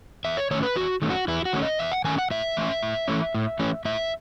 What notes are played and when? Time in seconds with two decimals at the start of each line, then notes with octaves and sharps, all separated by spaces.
0.25 E2 E5
0.37 C#5
0.51 D#3 A3 C#4 C#5
0.63 B4
0.76 E2 F#4
1.02 D#3 A3 C#4
1.10 F#4
1.28 E2 E4
1.45 F#4
1.53 D#3 A3 C#4
1.62 D#5
1.79 E2 E5
1.92 F#5
2.04 D#3 A3 C#4 G#5
2.18 F#5
2.31 A2 E5
2.57 E3 A3 C#4
2.83 A2
3.08 E3 A3 C#4
3.35 A2
3.59 E3 A3 C#4
3.85 A2 E5